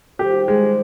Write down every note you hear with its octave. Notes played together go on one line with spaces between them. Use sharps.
D#3 G3 A#3 F4 G4 C5
G#3